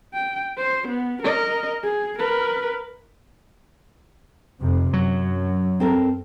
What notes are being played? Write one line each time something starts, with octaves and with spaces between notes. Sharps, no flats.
G5
C5
B3
A#4 D#5
G#4
A#4 B4
F2 C3
F#2 F#3
C4 A4 A#4